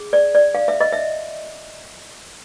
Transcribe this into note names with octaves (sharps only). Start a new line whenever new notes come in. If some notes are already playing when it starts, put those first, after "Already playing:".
Already playing: G#4
D5
D5
F5
E5
D#5
E5